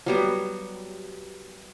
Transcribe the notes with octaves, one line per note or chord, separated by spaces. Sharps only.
F#3 G3 B3